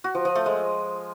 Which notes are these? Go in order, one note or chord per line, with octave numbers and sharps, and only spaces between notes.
F#4
F3
F3
A3
G#3